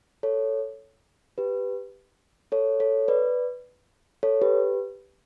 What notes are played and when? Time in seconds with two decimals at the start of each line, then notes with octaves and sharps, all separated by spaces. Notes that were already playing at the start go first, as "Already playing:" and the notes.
0.23 A4 C#5
1.38 G4 B4
2.52 A4 C#5
2.80 A4 C#5
3.08 B4 D5
4.23 A4 C#5
4.42 G4 B4